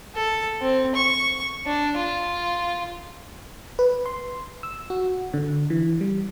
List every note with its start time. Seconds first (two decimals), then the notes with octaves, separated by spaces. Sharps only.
0.16 A4
0.61 C4
0.96 C#6
1.67 D4
1.97 F4
3.79 B4
4.06 C6
4.63 E6
4.90 F#4
5.34 D3
5.70 E3
6.01 G3